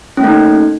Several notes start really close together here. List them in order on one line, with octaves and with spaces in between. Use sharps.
C#4 A#3 A3 D#4